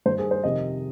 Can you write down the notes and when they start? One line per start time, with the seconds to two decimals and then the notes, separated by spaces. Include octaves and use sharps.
0.06 G2 D#3 C5
0.18 G#4
0.31 C5
0.43 F2 C3 D#3 D#5